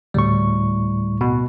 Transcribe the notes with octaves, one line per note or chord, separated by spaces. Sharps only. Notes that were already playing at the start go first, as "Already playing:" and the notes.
D2 A2 G3 C#6
B2